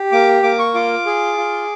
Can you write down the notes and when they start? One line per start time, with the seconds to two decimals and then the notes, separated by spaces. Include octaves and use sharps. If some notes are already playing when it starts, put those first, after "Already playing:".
Already playing: G4
0.12 A#3 D6
0.43 A#3 D6
0.59 C#6
0.74 F4 D6
1.06 G#4
1.37 F4